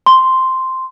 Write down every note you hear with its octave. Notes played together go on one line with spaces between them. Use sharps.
C6